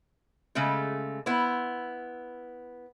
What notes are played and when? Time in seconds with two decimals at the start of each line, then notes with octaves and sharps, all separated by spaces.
0.55 C#3 G#3 A3 A4
1.26 B3 E4 C5